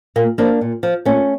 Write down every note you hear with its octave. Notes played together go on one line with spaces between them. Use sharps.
A#2 A#3
F3 A#3 D4
A#2
F3
A#2 A3 C#4